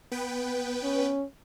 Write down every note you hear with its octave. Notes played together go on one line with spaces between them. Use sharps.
B3 B4 G5
C#4